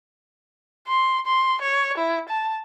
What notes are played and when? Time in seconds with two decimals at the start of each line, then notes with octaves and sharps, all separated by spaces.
0.87 C6
1.26 C6
1.61 C#5
1.98 E4
2.29 A5